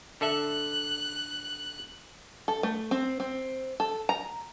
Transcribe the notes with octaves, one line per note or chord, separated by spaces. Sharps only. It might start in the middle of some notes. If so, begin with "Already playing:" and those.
D3 A4 E5 F#6
A4
A3
C4
C4
A4
A#5